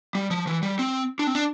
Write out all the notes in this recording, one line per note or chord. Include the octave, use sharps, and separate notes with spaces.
G3
F3
E3
G3
C4
D4
C4
D4